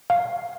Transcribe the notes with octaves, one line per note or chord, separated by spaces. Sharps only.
F5